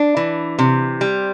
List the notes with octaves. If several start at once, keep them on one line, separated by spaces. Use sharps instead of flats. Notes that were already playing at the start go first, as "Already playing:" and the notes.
Already playing: D4
E3
C3
G3